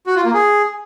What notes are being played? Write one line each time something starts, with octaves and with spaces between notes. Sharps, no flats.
F#4
F4
A#3
G#4